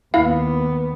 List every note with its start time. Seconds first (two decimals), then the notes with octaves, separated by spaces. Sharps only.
0.14 D#2 B3 E4 F5